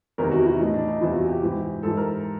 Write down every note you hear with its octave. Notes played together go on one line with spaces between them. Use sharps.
E2 C3 D#3 A#4
F#4
E4
A2 E3 D#4
D4
D#4
E2 C3 E3 E4
F4
F#4
G4
G#2 E3
G#2 E3 A4
A#4